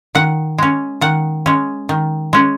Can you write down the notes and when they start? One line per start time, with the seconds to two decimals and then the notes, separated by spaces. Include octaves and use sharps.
0.15 D#3 F#5
0.58 G#3 C#4
1.01 D#3 F#5
1.46 G#3 C#4
1.89 D#3
2.33 G#3 C#4